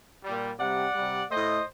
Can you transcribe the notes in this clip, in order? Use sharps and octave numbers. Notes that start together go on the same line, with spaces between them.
G3
A#2
C3 G3 D5 F#5
C3 G3
A2 A3 C5 D#5